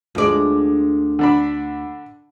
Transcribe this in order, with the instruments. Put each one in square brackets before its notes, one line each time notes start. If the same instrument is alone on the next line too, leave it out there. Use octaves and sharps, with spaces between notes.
[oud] D2 D5 [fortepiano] F3 G#3
[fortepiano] D3 D4 B5